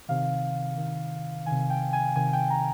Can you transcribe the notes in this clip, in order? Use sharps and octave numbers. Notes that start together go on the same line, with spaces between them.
C3 D#3 F5
C3 D#3
C3 D#3 G#5
G5
G#5
C3 D#3 G#5
G5
A#5